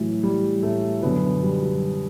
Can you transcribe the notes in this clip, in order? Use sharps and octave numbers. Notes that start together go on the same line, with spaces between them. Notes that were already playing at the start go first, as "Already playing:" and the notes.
Already playing: A2 E3 F#3
G3
A2 A3
F#2 B2 D3 B3
G3
F#3